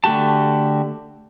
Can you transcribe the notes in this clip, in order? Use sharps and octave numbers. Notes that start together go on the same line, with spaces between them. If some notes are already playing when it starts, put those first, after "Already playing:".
D3 A3 F#4 G4 A5